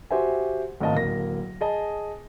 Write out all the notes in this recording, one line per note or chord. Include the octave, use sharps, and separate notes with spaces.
F#4 G4 C5 E5 G#5
G#1 A2 A#3 D#5 F5 A5
D1 A#3 A#6
G#4 D#5 A5